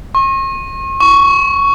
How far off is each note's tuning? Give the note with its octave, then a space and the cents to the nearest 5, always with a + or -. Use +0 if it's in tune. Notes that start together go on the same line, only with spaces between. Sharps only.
C#6 -45
C#6 +10